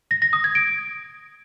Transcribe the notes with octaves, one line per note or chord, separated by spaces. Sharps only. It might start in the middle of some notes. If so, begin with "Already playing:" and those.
A#6
A#6
D#6
G#6
D7